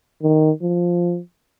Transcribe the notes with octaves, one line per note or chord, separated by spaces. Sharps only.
D#3
F3